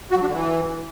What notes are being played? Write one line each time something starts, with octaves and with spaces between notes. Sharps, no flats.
F#4
F#3
D4
D3
E3